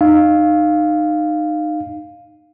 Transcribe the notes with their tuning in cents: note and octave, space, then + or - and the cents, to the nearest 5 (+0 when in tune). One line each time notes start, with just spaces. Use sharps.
D#4 -25 F5 +0